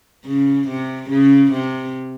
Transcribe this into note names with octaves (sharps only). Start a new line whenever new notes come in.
C#3
C3
C#3
C3